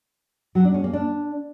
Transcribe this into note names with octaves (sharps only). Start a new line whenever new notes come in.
F#3
D4
C#4
A#3
D4